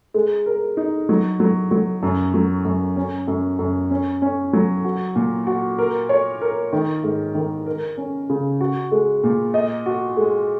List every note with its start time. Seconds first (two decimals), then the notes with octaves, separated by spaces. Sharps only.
0.14 G#3
0.46 A#4
0.77 D#4
1.09 F#3
1.40 F#3
1.71 F#3
2.03 F#2
2.34 F#3
2.65 F#2
2.97 C#4
3.28 F#2
3.59 F#2
3.91 C#4
4.22 C#4
4.53 F#3
4.85 F#4
5.16 A#2
5.47 F#4
5.79 A#4
6.09 C#5
6.41 A#4
6.73 D#3
7.04 G#2
7.35 D#3
7.66 A#4
7.97 C#4
8.30 C#3
8.61 F#4
8.92 G#3
9.24 A#2
9.54 D#5
9.86 F#4
10.17 G#3